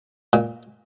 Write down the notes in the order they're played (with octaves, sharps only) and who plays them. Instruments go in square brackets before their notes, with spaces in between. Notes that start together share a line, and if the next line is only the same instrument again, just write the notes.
[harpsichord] A#2